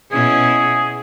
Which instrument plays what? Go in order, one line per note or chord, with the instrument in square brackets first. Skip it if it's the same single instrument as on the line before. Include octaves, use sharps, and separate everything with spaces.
[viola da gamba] B2 C#4 E4 [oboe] G#4